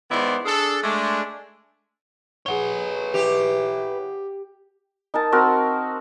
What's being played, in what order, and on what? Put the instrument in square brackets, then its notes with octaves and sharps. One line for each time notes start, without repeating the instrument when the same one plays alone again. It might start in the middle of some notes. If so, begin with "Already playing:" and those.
[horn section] D#3 G#3 B3 E4 C5 D5
D4 G#4 A4
G#3 A3 D4
[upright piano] G#4 F#5 G7 [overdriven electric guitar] B4 C#5
[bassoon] E3 [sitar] G4
[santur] D#4 A#4 A5
C4 F#4 A#4